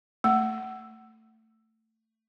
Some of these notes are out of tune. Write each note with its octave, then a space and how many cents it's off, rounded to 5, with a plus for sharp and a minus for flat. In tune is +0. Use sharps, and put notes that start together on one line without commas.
A3 +15 F#5 +25